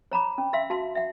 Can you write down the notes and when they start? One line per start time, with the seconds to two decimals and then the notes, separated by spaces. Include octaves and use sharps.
0.12 C#5 A#5 B5 D6
0.38 C#4
0.53 E5 F5 C6 E6
0.70 F#4 F5 A5 C6
0.95 E5 F#5